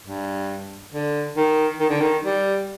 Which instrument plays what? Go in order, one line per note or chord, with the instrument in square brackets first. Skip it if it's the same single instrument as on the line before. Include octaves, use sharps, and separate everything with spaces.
[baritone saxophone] G2
D3
D#3
D#3
D3
D#3
G3